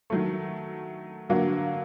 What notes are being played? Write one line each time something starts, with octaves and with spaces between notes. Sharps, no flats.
D#3 F#3 A3
D3 F#3 A#3 D4 F#4